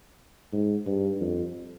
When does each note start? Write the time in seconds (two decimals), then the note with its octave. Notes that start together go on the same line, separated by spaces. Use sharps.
0.52 G#2
0.86 G2
1.20 F2